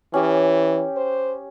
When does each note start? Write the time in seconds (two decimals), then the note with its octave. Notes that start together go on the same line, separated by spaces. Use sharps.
0.14 E3 C#4 G4
0.97 C5